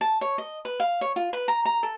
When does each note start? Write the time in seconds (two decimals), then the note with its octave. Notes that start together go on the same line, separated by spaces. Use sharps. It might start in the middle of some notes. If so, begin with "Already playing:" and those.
0.01 A5
0.21 C#5
0.38 D#5
0.65 B4
0.80 F5
1.01 C#5
1.16 F4
1.33 B4
1.48 A#5
1.65 A#5
1.83 A4